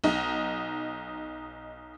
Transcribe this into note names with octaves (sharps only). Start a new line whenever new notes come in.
B1 D#4